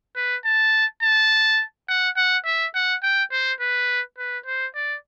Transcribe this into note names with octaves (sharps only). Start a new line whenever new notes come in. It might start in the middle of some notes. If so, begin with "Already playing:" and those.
B4
A5
A5
F#5
F#5
E5
F#5
G5
C5
B4
B4
C5
D5